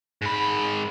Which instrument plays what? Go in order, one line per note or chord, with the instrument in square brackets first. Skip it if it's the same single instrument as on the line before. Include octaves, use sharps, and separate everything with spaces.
[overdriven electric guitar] G#2 B5